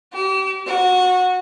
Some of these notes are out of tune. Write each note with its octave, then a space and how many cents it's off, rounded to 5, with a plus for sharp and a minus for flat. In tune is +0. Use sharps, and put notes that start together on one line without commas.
G4 -35
F#4 -20